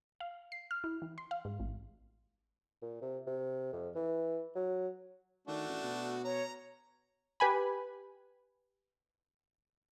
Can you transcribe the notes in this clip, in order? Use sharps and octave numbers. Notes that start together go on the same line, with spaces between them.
F5
C7
F6
E4
E3
C6
F5
G#2
A1
A#2
C3
C3
F2
E3
F#3
D#3 A3 D4 F#4
A1
B2
C#5 A#5
G4 B4 G#5 B5